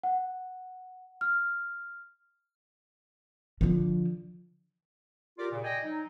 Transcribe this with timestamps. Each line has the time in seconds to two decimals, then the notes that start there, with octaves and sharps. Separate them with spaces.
0.03 F#5
1.21 F6
3.61 D3 F3
5.38 F4 G4 A#4 D5
5.51 A#2 C#3
5.63 D5 D#5 G5 G#5
5.84 F#3 D#4